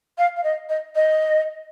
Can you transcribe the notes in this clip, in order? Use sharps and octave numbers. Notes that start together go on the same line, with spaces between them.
F5
F5
D#5
D#5
D#5